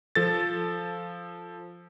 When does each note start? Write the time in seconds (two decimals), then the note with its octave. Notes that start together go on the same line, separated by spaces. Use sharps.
0.15 F3 A4 A6